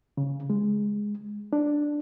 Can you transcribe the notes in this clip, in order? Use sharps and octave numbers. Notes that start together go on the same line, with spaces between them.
C#3
G#3
D4